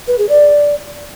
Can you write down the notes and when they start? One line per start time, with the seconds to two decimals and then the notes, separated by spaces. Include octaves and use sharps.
0.08 B4
0.18 G#4
0.29 D5